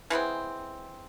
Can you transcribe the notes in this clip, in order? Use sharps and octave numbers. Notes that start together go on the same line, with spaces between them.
E3 G#3 B3 C4